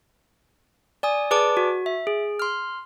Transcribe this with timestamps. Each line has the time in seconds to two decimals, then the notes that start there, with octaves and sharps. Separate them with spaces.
1.03 D5 G#5 D#6
1.31 G#4 B4 D5 A5 D6
1.57 F#4
1.86 E5
2.07 G#4
2.39 C6 F6